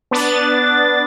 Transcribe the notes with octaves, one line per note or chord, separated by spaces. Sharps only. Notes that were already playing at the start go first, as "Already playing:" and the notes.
B3 D4 A6